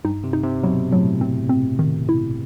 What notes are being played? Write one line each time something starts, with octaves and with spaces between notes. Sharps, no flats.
G2 D#4
C3
D#4
C3
B2 F#3
A2 F#3
C4
C4
D#3
E4